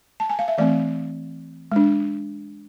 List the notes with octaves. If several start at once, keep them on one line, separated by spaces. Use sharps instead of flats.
A5
G#5
F5
E5
E3 A3 C4 D5
G#3 D4